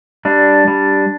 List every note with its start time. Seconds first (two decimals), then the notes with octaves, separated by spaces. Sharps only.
0.25 G3 D4
0.68 G3